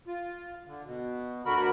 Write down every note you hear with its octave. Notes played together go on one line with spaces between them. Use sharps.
F4
D3
B2
D2 D3 F#4 A#4 B5